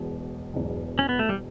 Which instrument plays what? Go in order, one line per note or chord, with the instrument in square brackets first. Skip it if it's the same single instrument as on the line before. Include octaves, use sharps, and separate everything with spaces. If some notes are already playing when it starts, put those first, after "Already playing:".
Already playing: [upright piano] E1 E2 B2
E1 E2 B2
[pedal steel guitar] C#4
B3
A3
G3